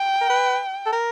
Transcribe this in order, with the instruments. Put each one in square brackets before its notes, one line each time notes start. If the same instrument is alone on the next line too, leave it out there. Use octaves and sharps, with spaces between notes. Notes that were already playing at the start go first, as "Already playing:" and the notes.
Already playing: [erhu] G5
[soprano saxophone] A#4
B4
A4
A#4